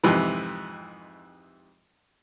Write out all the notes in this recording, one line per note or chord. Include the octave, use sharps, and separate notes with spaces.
F2 G#2 C3 E3